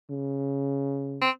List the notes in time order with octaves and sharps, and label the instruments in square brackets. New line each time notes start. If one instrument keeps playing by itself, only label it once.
[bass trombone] C#3
[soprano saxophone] C4